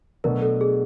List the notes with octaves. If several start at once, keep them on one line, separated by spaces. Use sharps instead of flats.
B2 F#3 A3 D4 A#4
A4
G#4